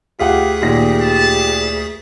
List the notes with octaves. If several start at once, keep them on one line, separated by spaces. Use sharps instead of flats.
D2 F4 G4 G#4 F#5 B6
A#2 D#3 G4 A#6
A5